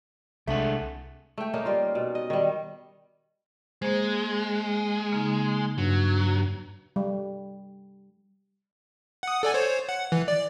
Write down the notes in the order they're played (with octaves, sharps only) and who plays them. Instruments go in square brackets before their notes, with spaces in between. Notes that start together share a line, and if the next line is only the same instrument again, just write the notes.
[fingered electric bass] C2 [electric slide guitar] G#3 D4 F#5 [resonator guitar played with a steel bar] A3
[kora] A3 G5
A#3 C#4 D#4 A#4
G3 F4
B2
D#5
D#3 G3
[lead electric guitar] G#3 [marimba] A#3 C5
[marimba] C#3 A#3 D#4
[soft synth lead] G2 [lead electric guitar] F#3
[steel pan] G3
[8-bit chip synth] F#5 D#6
A4 D5 G#5
C5 C#5
F#5
E3
D5